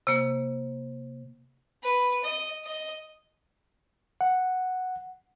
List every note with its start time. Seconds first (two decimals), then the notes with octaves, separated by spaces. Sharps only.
0.07 C3 A#3
1.83 B4
2.24 D#5
2.65 D#5
4.21 F#5